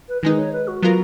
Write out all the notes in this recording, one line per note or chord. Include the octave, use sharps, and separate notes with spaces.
B4
D#3 G#3 D#4 B4
C#5
B4
F#4
F#3 B3 F4 A#4